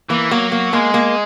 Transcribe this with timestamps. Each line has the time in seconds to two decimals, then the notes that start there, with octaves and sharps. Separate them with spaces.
0.10 E3 A#3
0.31 F#3 A#3
0.52 A#3
0.73 G#3 A#3
0.94 A#3